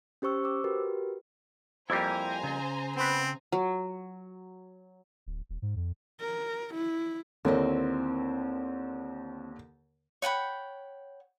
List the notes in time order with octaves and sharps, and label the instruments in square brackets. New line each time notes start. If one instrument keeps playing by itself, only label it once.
[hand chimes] C#4 G4 C5 C#6 E6
C5 D6 E6
F#4 G4 A#4 B4
[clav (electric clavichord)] F2 G3 A#3 [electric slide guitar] E4 G4 [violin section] C5 G#5 A#5
[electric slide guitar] C#3
[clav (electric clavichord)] B3 B4 [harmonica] C4
[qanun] F#3
[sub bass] D1
D#1
G#2
F2
[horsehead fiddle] A#4
E4
[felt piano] D#2 D3 A#3 [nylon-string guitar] C4 E4 D#5
[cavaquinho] C#5 F#5 G5 B5